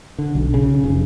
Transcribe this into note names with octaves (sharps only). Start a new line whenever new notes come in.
D3
B1
C#3
F1